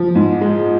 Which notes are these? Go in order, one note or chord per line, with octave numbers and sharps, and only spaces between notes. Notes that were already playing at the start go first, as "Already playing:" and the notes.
Already playing: F3
G#2
G#3